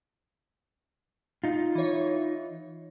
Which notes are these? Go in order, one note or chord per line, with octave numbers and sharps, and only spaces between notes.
D#4 F4
E3 C#5